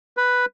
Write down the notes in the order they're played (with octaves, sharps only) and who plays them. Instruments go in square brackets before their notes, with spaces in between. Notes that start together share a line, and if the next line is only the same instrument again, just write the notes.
[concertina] B4